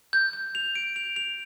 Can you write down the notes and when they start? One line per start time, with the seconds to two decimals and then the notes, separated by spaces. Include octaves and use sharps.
0.13 G6
0.33 G6
0.55 F7
0.75 D7
0.96 F7
1.16 F7